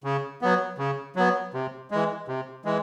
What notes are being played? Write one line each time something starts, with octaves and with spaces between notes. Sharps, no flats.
C#3
F#3 B3
C#3
F#3 B3
C3
E3 G#3
C3
E3 G#3